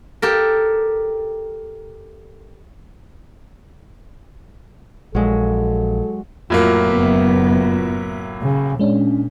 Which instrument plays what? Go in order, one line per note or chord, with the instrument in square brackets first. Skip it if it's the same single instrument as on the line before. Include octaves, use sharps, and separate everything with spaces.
[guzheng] G4 A4 A#4
[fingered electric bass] A#1 [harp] F#3 G#3 [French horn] A4
[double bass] F2 [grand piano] A2 F#3 A#3 [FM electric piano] F4 E5 B6
[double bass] F#1 B3
C#3
[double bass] A#2 [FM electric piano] G#3 C#4 D4